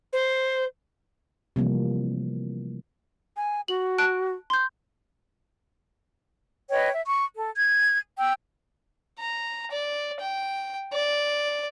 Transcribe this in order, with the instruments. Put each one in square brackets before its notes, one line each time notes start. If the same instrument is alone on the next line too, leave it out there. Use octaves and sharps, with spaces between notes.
[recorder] C5
[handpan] C3 E3 F3 G3 A3 A#3
[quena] G#5
[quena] F#4 [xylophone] F#7
[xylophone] A5 F#6 D7
C6 G6
[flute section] B4 C#5 D#5 G5
E5
C#6
A4
G#6
G5 E6
[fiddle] A#5
D5
G5
D5